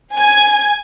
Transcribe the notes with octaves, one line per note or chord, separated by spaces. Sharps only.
G#5 G#6